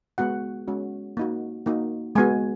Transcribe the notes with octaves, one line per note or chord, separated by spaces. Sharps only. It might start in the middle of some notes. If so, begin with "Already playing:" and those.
G#3 B3 F#4 F#5
G#3 C#4 F#4
A#3 D#4 F#4
A#3 D#4 F#4
G#3 B3 F#4 G#5